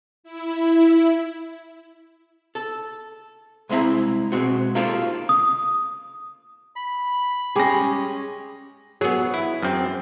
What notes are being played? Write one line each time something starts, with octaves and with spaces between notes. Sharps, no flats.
E4
A4
C2 G#3 C4 E4 A#5
B2 G#3 C4 F#4
A#3 D#4 F4 G4 A4 C5
D#6
B5
G3 G#3 C#4 G4 G#4 A#6
F#3 B3 G#4
E4
F#2 C4